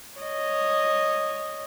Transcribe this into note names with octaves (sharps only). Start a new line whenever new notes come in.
C#5 D#5